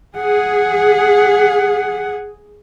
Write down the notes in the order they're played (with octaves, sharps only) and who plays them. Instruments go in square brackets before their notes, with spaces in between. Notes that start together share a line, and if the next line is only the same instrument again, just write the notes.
[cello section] G#4 [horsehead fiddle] F#5